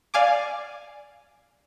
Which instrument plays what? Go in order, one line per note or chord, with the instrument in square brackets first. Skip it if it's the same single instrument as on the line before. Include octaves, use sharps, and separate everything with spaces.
[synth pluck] D5 F5 G#5 D6